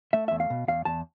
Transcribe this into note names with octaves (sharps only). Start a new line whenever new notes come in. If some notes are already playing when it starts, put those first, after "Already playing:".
A3 E5
E2 E5
F5
B2
E2 F5
E2 A5